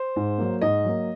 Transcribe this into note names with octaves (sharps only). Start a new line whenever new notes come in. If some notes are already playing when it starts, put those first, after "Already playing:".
Already playing: C5
G#2
F#3 A#3
G#2 D#5
F#3 A#3